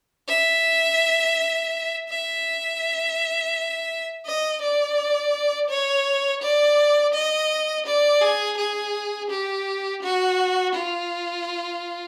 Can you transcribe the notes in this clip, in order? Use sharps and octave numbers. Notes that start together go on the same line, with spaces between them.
E5
E5
D#5
D5
C#5
D5
D#5
D5
G#4
G#4
G4
F#4
F4